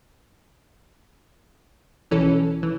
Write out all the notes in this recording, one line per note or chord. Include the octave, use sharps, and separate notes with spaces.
B1 E3 C#4 A4
E3